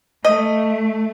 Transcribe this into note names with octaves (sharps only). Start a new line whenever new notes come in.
A3 D#5